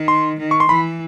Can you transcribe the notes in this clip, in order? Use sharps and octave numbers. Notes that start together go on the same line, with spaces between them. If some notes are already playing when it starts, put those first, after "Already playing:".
Already playing: D#3
C6
D#3
C#6
C6
E3 B5